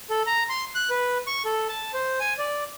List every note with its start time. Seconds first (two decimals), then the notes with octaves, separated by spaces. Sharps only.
0.10 A4
0.27 A#5
0.49 C6
0.75 F#6
0.90 B4
1.27 C#6
1.45 A4
1.69 A5
1.93 C5
2.20 G#5
2.38 D5